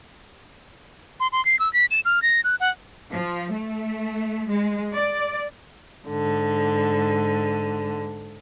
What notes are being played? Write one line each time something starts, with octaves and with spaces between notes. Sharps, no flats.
C6
C6
C7
E6
B6
E7
F6
A#6
F#6
F#5
F3
A3
G#3
D5
G#2 D3